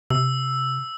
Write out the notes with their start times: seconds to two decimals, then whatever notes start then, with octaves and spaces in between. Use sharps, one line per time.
0.10 C3 E6